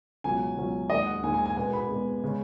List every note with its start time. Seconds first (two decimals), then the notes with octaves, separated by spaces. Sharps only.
0.24 C#2 B2 F#3 C#4 G#5
0.56 C#2 B2 F#3 C#4
0.89 D#2 D#3 G#3 D#5
1.06 F#5
1.23 D#2 D#3 G#3 G#5
1.34 G#5
1.46 G#5
1.57 B2 G#3 B3 G#5
1.73 B5
1.89 B2 G#3 B3
2.24 C#3 G#3 C#4